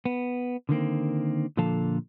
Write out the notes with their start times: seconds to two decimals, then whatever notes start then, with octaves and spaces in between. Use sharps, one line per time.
0.05 B3
0.69 D3 D#3 A#3 C4
1.57 A#2 D3 F3 A4 F5 A5